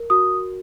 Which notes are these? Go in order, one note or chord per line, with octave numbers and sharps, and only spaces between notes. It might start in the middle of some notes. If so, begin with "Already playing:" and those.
Already playing: A#4
F#4 D#6